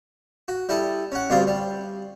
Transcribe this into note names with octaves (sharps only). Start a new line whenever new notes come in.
F#4
G3 E4 A4 D#6
C#4 F#5
D2 G2 C4 F4 D5 D#6
G3